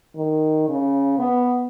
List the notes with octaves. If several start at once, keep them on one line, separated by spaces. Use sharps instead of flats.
D#3
C#3
B3